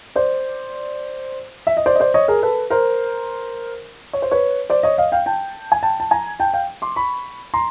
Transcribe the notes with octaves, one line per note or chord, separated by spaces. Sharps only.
C5 D5
E5
D#5
C5 D5
D#5
C5 D5
C#5 D#5
G#4 A#4
A4 B4
A#4 C5
C#5
C5
B4 C#5
C5 D5
C#5 D#5
D#5 F5
F5 G5
G5 A5
G#5
G5 A5
A5
G#5 A#5
G5 A5
F5 G5
C6 D6
B5 C#6
A#5 C6